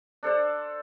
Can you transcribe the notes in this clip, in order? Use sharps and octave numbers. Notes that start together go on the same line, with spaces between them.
D4 A4 C5 D5